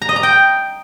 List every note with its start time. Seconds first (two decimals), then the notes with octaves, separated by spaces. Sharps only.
0.02 A#5
0.09 D#5
0.16 A#5
0.23 G5